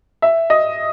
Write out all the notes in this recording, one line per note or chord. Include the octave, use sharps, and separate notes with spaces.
E5
D#5